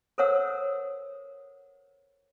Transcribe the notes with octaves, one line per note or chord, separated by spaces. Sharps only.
A4 A#4 C5 C#5 F#5 E6